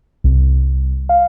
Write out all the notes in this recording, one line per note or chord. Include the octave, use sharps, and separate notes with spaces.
C2
F5